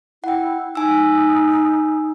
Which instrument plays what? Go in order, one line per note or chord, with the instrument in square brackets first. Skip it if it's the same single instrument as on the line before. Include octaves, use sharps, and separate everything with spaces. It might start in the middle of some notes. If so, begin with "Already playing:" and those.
[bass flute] E4 [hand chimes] F#5 G5
[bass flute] D#4 [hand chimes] G#5 E6